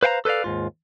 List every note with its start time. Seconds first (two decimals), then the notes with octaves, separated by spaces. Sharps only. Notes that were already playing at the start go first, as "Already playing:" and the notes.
0.03 B4 C5 F5 G5 A#5
0.25 A4 B4 C5 D5 F5
0.44 D#2 G#2 F4